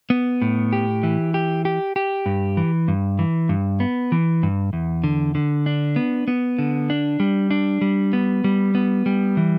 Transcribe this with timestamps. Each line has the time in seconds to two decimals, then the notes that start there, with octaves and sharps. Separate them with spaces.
0.10 B3
0.42 A2
0.73 G4
1.03 E3
1.34 G4
1.65 G4
1.96 G4
2.26 G2
2.57 E3
2.88 G2
3.19 E3
3.49 G2
3.80 B3
4.12 E3
4.43 G2
4.73 E2
5.04 D3
5.35 D3
5.66 D4
5.96 B3
6.28 B3
6.59 D3
6.90 D4
7.20 G3
7.51 D4
7.81 G3
8.13 B3
8.44 G3
8.75 B3
9.06 G3
9.37 E3